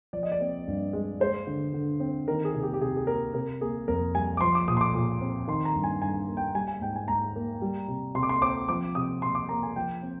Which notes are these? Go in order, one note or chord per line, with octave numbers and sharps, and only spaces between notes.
F3 D5
D#5
D5
C4
G2
G#3
G#3 C5
D3
D3
C4
D#3 A#4
G#4
C3
G#4
G4
G4
C3 G#4
G#4
A#3 A#4
C3 A#4
A#3 G#4
F2 A#4
G3 G#5
D6
F3 C6
D6
A#2 D#6
C6
D6
A#2
C4
D#3 C6
A#5
G2
G#5
G2 G#5
A#3
G5
G3 G#5
G#5
G#2 G5
G#5
G#2 A#5
A#3
G3
C3
C3 C6
D6
C6
C4 D6
F3 D6
C3 D#6
C3 C6
D6
A#3 A#5
G#5
F3 G5
C4